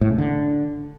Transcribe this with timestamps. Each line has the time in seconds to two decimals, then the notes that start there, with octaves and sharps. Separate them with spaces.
0.01 A2
0.10 C#3
0.18 D3